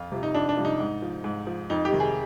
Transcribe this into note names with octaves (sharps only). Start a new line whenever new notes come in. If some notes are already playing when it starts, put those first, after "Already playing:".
Already playing: F2 F4
C3 F3
D#4
F2 D4
D4
C3 F3
D#4
G#2
F3
G#2
F3
F2 D#4
G4
C3 D#3
G#4